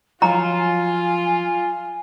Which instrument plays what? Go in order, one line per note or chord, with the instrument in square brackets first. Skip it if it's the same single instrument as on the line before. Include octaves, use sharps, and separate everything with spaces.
[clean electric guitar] F3 F#3 C#5 [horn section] F4 [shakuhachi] G#5 [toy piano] A#5